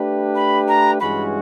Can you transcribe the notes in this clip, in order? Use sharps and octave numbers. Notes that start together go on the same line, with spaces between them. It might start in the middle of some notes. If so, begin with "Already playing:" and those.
Already playing: A3 D4 G4 B4
B5
A#5
G2 E3 G#3 C#4 F#4 B5